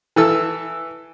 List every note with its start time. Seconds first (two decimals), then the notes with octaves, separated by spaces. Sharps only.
0.16 E3 A4 E6